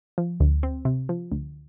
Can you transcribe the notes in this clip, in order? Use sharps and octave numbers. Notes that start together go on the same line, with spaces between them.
F3
D2
C4
C3
F3
D2